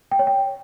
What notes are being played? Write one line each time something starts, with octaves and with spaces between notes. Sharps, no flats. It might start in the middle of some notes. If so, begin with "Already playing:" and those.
G5
C#5
G5